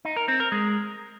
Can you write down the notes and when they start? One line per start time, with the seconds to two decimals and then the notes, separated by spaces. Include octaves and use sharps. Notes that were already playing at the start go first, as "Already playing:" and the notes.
0.05 D#4
0.16 A#4
0.28 C4
0.40 A#4
0.52 G#3